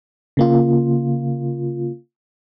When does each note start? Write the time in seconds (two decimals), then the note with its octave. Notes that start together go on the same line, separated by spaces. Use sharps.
0.37 C#3 A#3 F4